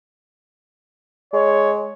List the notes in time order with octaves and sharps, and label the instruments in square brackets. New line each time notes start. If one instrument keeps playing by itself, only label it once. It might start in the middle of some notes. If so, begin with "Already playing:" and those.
[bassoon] G#3 [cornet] C#5